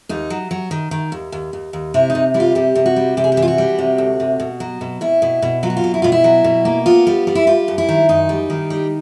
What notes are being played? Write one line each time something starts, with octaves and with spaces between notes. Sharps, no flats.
D#2 D#4
F#3
F#3
D#3
D#3
D#2
D#2
D#2
D#2
C3 E4
D#4
C3
G3 E4
F4
C3 G4
C3
F#4
G3
C3 G4
G#4
G4
E3
F4
F#4
G3
C3
D2
C3
B2
F#3
B2
B2 E4
B2
B2
F#3 F4
F#4
F4
B2
E4
B2 F4
E4
F#3
B2
A#3
B3 F4
G3
G3
E4
G3 F4
F#2
E4
D#3
F#2 D#4
G3
D#3
G3